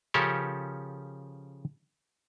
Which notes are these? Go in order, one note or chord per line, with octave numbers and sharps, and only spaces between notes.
C#3 F3 C#4 G4 A4 A#4